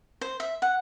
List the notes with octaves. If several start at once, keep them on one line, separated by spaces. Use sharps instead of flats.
C5
E5
F#5